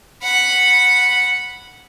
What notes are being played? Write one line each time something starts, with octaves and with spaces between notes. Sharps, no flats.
F#5 B5